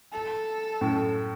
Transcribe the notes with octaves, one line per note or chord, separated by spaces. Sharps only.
A4
F#2 A2